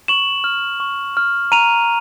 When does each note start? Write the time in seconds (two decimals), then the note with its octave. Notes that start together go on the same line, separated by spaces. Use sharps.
0.08 C#6 E7 F#7
0.44 F6
0.80 C#6
1.17 F6
1.52 A#5 D#7 F7